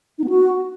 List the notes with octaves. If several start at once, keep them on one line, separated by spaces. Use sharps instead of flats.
D#4
B3
F#4